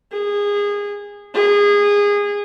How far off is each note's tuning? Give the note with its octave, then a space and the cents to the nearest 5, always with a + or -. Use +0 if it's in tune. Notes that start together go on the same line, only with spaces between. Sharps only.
G#4 -25
G#4 -25